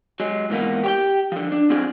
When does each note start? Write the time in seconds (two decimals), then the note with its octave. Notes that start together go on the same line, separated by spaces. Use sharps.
0.20 F#3 G#3
0.50 G#2 E3 A#3 B3
0.84 G4 C#5 G5
1.32 D3 F3
1.52 D4
1.70 F#3 C4 F4 G#4 D5